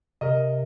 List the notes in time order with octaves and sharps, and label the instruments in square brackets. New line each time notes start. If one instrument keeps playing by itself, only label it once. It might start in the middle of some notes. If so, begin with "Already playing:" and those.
[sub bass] C3 [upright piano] A#4 D#5